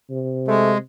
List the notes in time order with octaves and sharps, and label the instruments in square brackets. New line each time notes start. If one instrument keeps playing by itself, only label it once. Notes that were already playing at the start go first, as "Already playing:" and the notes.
[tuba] C3
[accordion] G#3 [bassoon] A3